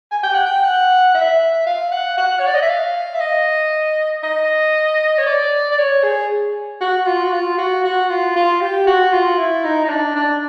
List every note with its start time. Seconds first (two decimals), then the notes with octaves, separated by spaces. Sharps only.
0.11 G#5
0.23 G5
0.34 F#5
0.45 G5
0.63 F#5
1.15 E5
1.66 F5
1.91 F#5
2.17 F#5
2.39 C#5
2.46 D5
2.54 D#5
2.62 E5
2.69 F5
3.14 E5
3.20 D#5
4.23 D#5
5.18 C#5
5.26 D5
5.72 D5
5.78 C#5
6.03 G#4
6.80 F#4
7.06 F4
7.24 F#4
7.32 F4
7.58 F#4
7.84 F#4
8.09 F4
8.35 F4
8.61 G4
8.86 F#4
9.12 F4
9.38 E4
9.64 D#4
9.85 D#4
9.89 D4
10.15 D4